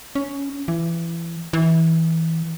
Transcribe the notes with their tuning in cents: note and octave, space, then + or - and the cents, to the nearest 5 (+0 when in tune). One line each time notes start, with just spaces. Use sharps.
C#4 +10
E3 +25
E3 -20